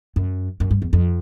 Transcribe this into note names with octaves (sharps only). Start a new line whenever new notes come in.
F#2
F#2
G2
E2
F2